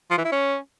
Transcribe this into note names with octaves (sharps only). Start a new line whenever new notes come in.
F3
E3
E4
C#4